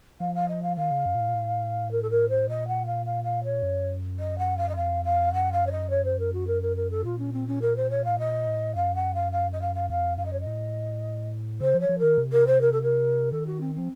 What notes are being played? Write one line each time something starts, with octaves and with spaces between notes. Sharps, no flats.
F3 F5
F5
D#5
F5
D#3 F5
C#3
F#2
A#2
A2
A#2
A2
A#4
A4
A#4
C5
A#2 D#5
F#5
F5
F5
F5
C#5
F#2
D#5
F#5
F5
D#5
F2 F5
F5
F#2 F#5
F5
C#5
D#5
C#5
C5
A#4
F#4
A#4
A#4
A#4
A4
A#2 F4
C#4
C4
C#4
A#4
C5
C#5
A2 F5
A#2 D#5
A2
F#2 F5
F#5
F5
F5
D#5
F5
F5
F2 F5
F#2 F5
D#5
C#5
D#5
A2
C#3 C5
F3
C#5
F3
D#3 A#4
C3
A#4
C5
A#4
A4
A#4
D#3 A4
F#4
C4
F3 C4